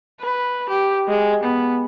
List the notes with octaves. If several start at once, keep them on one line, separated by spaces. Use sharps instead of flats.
B4
G4
G#3
B3